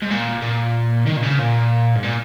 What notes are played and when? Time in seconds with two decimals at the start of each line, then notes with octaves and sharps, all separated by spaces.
0.02 G#2
0.10 A#2
0.42 A#2
1.06 D#3
1.16 A#2
1.22 C#3
1.38 A#2
1.95 G#2
2.03 A#2